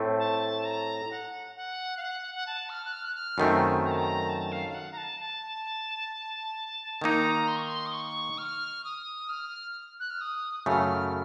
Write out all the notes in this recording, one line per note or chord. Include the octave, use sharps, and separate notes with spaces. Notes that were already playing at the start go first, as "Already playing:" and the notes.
Already playing: A2 A3 C4
A5
A#5
F#5
F#5
F5
F#5
F#5
A5
F6
F#6
F6
F#6
F6
F#2 D#3 A3 C4
A#5
A5
A#5
A5
F5
F5
F#5
A#5
A5
A5
D#3 A#3 D#4 A#5
C6
C#6
C6
D#6
C#6
F6
D#6
F6
F#6
F6
D#6
D#6
F#2 C#3 A3 F6
F6